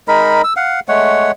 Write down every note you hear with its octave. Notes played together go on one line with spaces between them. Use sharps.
G#3 D#4 A#4 B5
E6
F5 F#5
G#3 A3 C#5 F#5